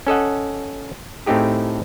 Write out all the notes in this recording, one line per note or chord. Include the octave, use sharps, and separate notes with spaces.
C#4 A4 D#5 F#5
A2 A3 C4 D#4 G4 G#4